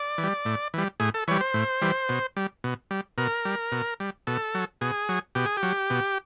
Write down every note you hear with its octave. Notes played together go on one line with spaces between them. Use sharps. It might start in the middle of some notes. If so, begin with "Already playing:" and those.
Already playing: D5
E3
G3
A2
E3 G3
A2 G#4
A4
E3 G3 C#5
C5
A2
E3 G3
B2
G3
B2
G3
B2 A#4
G3
B2
G3
B2 A4
F#3
B2 G#4
F#3
B2 G4
G#4
G4
F#3
B2